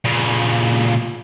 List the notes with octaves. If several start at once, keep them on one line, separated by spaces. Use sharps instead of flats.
A#2 C#3